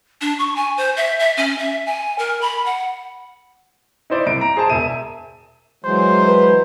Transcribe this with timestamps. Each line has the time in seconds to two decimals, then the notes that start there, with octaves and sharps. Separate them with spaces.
0.21 D4
0.39 C#6
0.56 G#5
0.77 C5
0.97 E5
1.20 E5
1.37 C#4
1.58 E5
1.86 G#5
2.19 A#4
2.41 B5
2.66 F#5
4.10 D#4 E4 C5 D5
4.26 C2 D7
4.41 A#5
4.57 G#4 C5 A5
4.70 E1 E5 D#7
5.84 E3 F#3 G#3 C5
6.28 B4